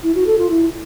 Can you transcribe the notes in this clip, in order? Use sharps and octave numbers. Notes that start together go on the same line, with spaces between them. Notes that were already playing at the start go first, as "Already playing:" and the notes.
E4
F#4
A4
F4
E4